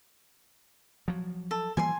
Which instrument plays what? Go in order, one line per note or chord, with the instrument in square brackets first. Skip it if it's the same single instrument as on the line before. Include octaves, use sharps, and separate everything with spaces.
[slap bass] F3 F#3
[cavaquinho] A4
[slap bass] E3 G3 A#3 [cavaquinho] G#5 C6